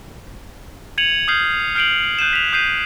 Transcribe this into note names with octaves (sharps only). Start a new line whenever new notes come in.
G#6 C#7 D#7 F7 F#7
D#6 F6 G6 C7
F6 G6 C7 D7 F7 F#7
F#6 G6 D#7 E7
B6 F7
D#6 G6 C7 D#7